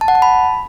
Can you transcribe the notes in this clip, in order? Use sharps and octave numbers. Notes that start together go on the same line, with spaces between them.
A5
F#5
A5
B5